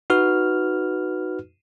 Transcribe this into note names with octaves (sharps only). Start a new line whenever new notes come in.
D#4 F#4 B4 F6